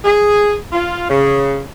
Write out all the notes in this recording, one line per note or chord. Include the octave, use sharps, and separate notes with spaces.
G#4
F4
C#3